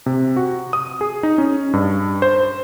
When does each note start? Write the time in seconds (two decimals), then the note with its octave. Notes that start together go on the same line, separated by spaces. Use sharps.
0.06 C3
0.36 F#4
0.73 D#6
1.01 G#4
1.23 D#4
1.38 C#4
1.73 G2
2.22 C5